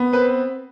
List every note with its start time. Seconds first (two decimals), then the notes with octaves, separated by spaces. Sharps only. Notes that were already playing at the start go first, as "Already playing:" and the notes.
Already playing: B3
0.12 C4 B4